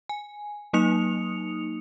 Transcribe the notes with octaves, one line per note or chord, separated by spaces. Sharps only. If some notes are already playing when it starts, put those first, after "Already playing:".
G#5
F#3 A#3 D#4 D#6 C#7 F7